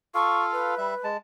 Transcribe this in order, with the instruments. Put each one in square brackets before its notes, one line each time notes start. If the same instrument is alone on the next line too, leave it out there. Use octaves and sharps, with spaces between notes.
[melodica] F4 A4 F5 [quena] C#6
[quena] B4
[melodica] G3 E5
G#3 A5